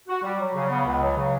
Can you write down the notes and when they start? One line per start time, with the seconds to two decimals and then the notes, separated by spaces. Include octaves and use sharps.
0.09 F#4
0.23 G3
0.40 F#3
0.55 C#3
0.71 B3
0.86 C#2
1.02 F#3
1.17 C#3